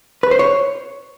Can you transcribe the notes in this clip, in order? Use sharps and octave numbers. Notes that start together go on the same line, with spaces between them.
B4
C5
C#5